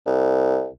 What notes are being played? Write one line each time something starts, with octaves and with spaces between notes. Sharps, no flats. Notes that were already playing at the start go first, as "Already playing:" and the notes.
C2